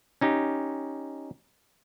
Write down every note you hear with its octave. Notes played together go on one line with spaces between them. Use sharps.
C#4 D#4 G4